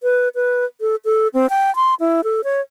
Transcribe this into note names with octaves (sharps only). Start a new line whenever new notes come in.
B4
B4
A4
A4
C4
G5
C6
E4
A4
C#5